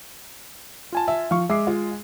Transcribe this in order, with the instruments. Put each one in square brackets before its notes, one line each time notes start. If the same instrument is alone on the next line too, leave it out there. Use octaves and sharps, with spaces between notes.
[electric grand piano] F4 G#5 A5
[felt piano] E5
[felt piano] F3 [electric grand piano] F5 C#6
[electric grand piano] G#3 C7 [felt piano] E5 D6
[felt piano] F4